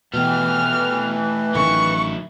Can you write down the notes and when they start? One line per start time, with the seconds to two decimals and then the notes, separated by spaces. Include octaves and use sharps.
0.14 B2 E3 A3 G4 F6
1.55 A1 D3 D#3 F#3 E4 C#6